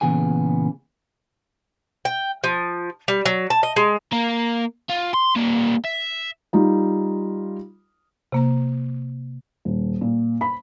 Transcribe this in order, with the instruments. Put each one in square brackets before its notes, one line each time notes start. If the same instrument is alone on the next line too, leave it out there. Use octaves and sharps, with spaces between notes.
[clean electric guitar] A#2 C#3 E3 B3 G#4 G#5
[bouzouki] G5
F3
G3
F#3
A5
D#5
G#3
[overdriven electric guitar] A#3 A#4
F4
C6
G3 A#3
E5
[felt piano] G3 D#4 F4
[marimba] C3 A#3 A#5
[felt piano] D#1
A#2
B5